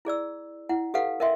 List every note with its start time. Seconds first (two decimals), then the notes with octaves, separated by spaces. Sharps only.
0.05 E4 G#4 D5 E6
0.69 E4 F#5
0.94 G4 A4 B4 F5 F#5
1.20 A#4 D#5 E5 G5 C6